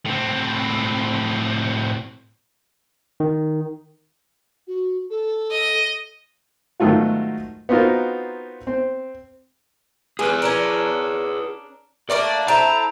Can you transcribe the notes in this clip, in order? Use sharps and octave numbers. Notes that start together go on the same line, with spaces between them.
A2 C4
D#3
F#4
A4
D#5
G#2 D#3 F#3 A3 F4 F#4
B3 C4 D#4 F4 F#4 A#4
C4
G#3 G#4 B4
C#4 D4 A#4
A3 A#3 D4 D5
C4 E4 A4 A#5